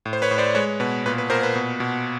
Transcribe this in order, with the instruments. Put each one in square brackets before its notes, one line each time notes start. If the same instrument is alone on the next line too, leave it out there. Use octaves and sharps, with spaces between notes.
[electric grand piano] A2
C5
B4 C#5
A2
C5 D5
G#3 B4 C#5
B2 B4
A#2 B4
B4
A#2 A#4 C5
B4
B2
B2